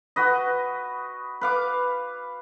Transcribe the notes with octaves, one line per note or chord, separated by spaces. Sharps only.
F#4 B4 D#5
B4 F5 D6